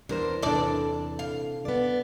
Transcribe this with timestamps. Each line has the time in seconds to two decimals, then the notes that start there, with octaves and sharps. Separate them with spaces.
0.09 E2 D4 A#4 C5
0.42 E2 C3 D4 A4 D5
1.19 F5
1.65 B3 D5